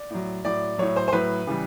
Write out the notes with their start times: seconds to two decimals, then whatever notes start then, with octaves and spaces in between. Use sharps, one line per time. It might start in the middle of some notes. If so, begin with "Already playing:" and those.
Already playing: D5
0.10 A2 F#3
0.45 A2 F#3 D5
0.78 A2 F#3 C#5
0.96 C5
1.08 C5
1.12 A2 F#3 B4
1.47 C#3 E3 G3